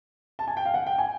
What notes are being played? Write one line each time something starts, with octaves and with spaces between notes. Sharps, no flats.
A5
G#5
G5
F5
F#5
G5
G#5